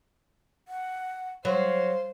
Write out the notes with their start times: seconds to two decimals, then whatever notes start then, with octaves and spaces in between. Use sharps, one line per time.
0.68 F#5
1.45 F#3 C5 F5